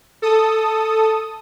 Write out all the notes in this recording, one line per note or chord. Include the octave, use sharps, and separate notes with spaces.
A4 D#6